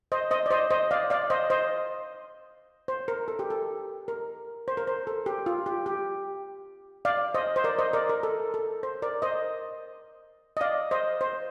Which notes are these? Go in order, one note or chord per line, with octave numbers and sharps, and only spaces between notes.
C5 D#5
C5 D#5
D5
C5 D#5
C5 D#5
D5 F5
D5 F5
C5 D#5
C5 D#5
C5
A#4
A4
G4
A4
A#4
C5
A#4
C5
A4
G4
F4
G4
G4
D5 F5
C5 D#5
C5
A#4 D5
C5 D#5
A#4 D5
A#4
A4
A4
C5
A#4 D5
C5 D#5
D#5
D5 F5
C5 D#5
C5